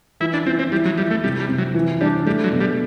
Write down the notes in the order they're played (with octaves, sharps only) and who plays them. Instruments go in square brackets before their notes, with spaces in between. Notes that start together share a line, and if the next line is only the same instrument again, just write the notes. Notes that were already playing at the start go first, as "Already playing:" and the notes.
[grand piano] E3 [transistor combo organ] E4
[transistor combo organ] D4
[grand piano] E3 [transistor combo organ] C4
[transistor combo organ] C4
[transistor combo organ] G3 [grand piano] E4
[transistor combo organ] F#3
[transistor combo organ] G3 [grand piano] E4
[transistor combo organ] A3
[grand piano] C3 [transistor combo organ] G3
[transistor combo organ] G3
[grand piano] C3
[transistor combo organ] F#3
[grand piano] E3
[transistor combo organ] G3 [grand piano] D4
[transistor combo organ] G3 [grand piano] A3
[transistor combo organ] F#3
[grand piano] B2
[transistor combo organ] G3